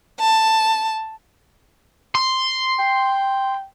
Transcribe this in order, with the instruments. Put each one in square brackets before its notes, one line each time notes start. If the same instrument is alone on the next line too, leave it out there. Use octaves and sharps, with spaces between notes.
[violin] A5
[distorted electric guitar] C6
[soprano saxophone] G5